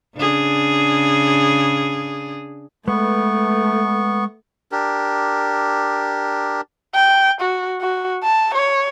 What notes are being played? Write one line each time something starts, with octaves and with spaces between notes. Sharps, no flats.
C#3 D4 G#4
G#3 A3 B3 B4 C#6
D4 G4 A#4
G5
F#4
F#4
A5
C#5